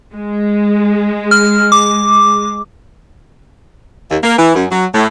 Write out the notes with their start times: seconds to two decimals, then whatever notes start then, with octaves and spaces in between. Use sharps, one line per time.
0.14 G#3
1.31 F6
1.72 D6
4.11 D#2
4.23 A#3
4.39 E3
4.55 F#2
4.72 F#3
4.94 A2